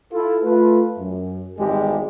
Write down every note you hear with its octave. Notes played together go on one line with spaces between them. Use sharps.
E4 F4 A4
A3 F4 B4
F#2
G#1 E2 G3 G#3 G4 G#4